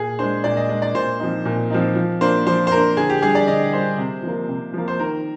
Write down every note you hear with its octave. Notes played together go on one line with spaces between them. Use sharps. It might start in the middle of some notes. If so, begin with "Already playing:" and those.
Already playing: A#2 G#4
G#3 D4 C5
A#2 D5
D#5
G#3 D4 D#5
D5
A#2 C5
F3 C4 D#4
A#2
F3 C4 D#4
F3
A#3 D4 C5
F3 C5
C5
A#3 D4 A#4
D3 G#4
G4
G3 D4 G#4
D5
D3 D#5
G3 D4 C5
C3
F3 A#3
C3
F3 A#3
C5
D#3 A#4